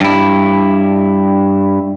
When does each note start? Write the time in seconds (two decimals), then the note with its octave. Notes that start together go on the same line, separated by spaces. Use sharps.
0.01 G2 E4